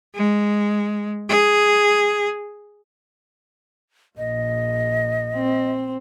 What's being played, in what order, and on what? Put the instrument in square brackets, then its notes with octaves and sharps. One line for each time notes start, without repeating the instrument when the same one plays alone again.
[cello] G#3
G#4
[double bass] A#1 [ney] D#5
[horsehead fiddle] C4